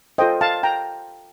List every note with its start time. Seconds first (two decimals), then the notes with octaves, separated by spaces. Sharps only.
0.18 F4 A4 C5 D#5 G5
0.41 F5 A5
0.63 G5 A#5